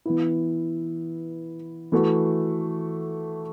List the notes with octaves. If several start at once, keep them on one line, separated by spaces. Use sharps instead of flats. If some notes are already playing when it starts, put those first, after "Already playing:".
E3 B3 E4
E3 A3 F#4